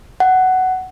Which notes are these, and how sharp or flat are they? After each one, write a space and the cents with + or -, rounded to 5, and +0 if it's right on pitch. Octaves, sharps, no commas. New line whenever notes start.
F#5 +10